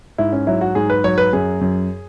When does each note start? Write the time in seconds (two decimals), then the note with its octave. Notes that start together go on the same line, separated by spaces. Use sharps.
0.18 G#2 E4
0.32 C#4
0.47 F#3 E4
0.61 F#4
0.75 G#2 G#4
0.90 B4
1.04 F#3 C#5
1.18 B4
1.33 F#2 G#4
1.61 F#2